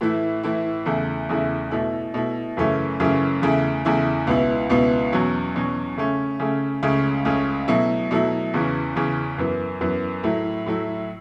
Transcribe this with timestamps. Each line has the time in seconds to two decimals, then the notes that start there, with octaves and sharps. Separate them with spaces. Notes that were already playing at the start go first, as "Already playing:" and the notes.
0.01 A2 E3 A3 E4
0.43 A2 E3 A3 E4
0.86 E2 C#3 A3 E4
1.29 E2 C#3 A3 E4
1.71 B2 A3 E4
2.14 B2 A3 E4
2.57 F#2 C#3 E3 A3 C#4
3.00 F#2 C#3 E3 A3 C#4
3.42 E2 C#3 A3 E4
3.85 E2 C#3 A3 E4
4.27 C#2 B2 B3 E4
4.70 C#2 B2 B3 E4
5.12 E2 B2 F#3 C#4
5.55 E2 B2 F#3 C#4
5.97 C#3 A3 C#4
6.40 C#3 A3 C#4
6.83 C#2 C#3 A3 C#4
7.25 C#2 C#3 A3 C#4
7.68 B2 F#3 A3 E4
8.11 B2 F#3 A3 E4
8.54 E2 C#3 E3 C#4
8.96 E2 C#3 E3 C#4
9.38 F#2 E3 B3
9.81 F#2 E3 B3
10.23 A2 F#3 A3 E4
10.66 A2 F#3 A3 E4